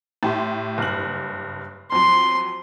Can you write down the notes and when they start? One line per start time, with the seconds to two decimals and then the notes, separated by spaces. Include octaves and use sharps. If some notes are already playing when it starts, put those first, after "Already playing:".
0.23 A2 G4 C6
0.78 F#1 G2 F#7
1.92 F2 F#3 C6